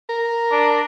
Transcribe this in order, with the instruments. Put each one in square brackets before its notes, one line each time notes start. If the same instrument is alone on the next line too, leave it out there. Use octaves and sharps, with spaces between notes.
[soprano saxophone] A#4
[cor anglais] D4